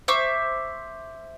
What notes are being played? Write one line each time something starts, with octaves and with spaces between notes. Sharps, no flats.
C5 E5 C#6 D6